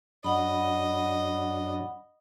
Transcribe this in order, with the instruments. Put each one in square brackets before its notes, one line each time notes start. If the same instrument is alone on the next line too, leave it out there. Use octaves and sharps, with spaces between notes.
[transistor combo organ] F#2 D4 [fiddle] D#5 [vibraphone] F#5 B5